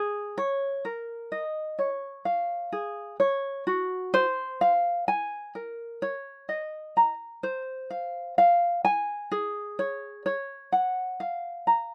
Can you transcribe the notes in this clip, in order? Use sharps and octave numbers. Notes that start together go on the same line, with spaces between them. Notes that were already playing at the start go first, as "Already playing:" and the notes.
Already playing: G#4
C#5
A#4
D#5
C#5
F5
G#4
C#5
F#4
C5
F5
G#5
A#4
C#5
D#5
A#5
C5
F5
F5
G#5
G#4
C#5
C#5
F#5
F5
A#5